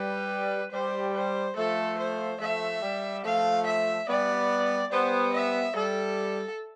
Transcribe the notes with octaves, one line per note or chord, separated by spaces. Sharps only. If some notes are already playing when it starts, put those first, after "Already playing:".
Already playing: G3 B4
G3 C5
C5
F3 A3 A4
C5
F3 A3 E5
G3
F3 A3 F5
E5
G3 B3 D5
G3 B3 C5
E5
G3 A4